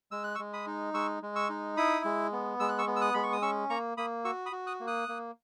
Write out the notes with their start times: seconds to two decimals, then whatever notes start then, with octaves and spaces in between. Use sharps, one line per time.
0.11 G#3 E6
0.24 F#6
0.35 C#6 E6
0.39 G#3
0.53 B5 D#6
0.67 D#4
0.94 G#3 C#6 E6
1.22 G#3
1.36 C#6 E6
1.50 D#4
1.77 E4 B5 D#6
2.05 G#3
2.32 B3
2.60 G#3 E6
2.69 F#6
2.78 C#6 E6
2.87 B3
2.96 E6
3.01 D#6 F#6
3.14 G#3 B5
3.23 C#6
3.33 D#6
3.42 C#4 C#6 E6
3.70 A#3 A#5 C#6
3.97 A#3 B5 D#6
4.25 F#4 C#6 E6
4.46 B5 D#6
4.52 F#4
4.67 D#6 F#6
4.80 A#3
4.87 D#6 F#6
5.08 A#3